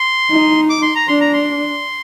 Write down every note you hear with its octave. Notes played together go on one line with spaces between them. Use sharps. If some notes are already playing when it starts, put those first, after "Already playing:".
Already playing: C6
D#4
D6
C6
A#5
D4 C6
A#5
C6